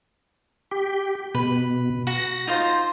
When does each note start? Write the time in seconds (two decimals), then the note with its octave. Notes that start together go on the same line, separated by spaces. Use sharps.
0.71 G4
1.35 B2 B4
2.07 F#4 A#6
2.47 D#4 F4 C5